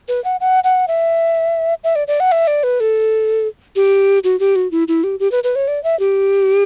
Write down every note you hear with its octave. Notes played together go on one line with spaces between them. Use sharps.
B4
F#5
F#5
F#5
E5
E5
D5
D5
F#5
E5
D5
B4
A4
G4
F#4
G4
F#4
E4
E4
G4
G4
B4
B4
C#5
D5
E5
G4